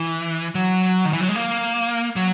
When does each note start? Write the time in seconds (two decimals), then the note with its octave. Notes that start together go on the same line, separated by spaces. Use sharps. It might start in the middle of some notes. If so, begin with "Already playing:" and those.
Already playing: E3
0.55 F#3
1.05 D#3
1.13 E3
1.21 F#3
1.29 G#3
1.35 A#3
2.16 F#3